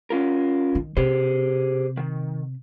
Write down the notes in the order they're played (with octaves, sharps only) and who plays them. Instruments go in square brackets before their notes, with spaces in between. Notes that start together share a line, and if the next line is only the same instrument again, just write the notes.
[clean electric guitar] C#4 F4 A#4
[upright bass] D#3
[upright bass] C3 [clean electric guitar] G4 G#4 C5
[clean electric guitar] D#3